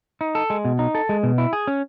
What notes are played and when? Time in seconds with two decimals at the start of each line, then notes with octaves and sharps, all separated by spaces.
0.21 D#4
0.35 A4
0.50 G#3
0.65 B2
0.79 D#4
0.95 A4
1.09 G#3
1.23 B2
1.38 E4
1.53 G#4
1.67 C#4